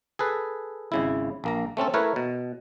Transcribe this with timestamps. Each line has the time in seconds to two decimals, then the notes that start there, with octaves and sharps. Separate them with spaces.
0.19 G#4 A4 B4
0.92 G#1 C#3 E4
1.44 A#1 A#3 A#5
1.77 A3 C4 C#4 A4
1.94 A3 E4 A#4 B4 C#5
2.16 B2